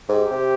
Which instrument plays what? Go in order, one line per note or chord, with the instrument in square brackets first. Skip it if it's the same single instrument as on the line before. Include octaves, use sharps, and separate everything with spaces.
[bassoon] G#2 [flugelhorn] G4
[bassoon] C3